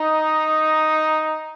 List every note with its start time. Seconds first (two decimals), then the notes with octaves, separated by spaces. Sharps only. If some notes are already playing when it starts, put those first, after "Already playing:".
Already playing: D#4